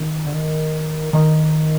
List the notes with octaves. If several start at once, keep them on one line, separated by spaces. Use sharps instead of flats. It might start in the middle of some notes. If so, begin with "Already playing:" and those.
Already playing: D#3
D3
D#3
D#3